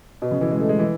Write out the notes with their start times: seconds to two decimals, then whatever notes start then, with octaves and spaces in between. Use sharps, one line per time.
0.22 B2
0.31 C#3
0.41 E3
0.51 G#3
0.59 A3
0.69 G#3
0.79 E3